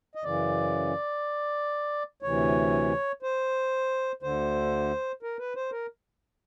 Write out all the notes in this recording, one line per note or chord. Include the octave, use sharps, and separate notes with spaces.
D#5
F#2 C#3 E3 D5
D2 C3 E3 C#5
C5
D2 D3 C5
A#4
B4
C5
A#4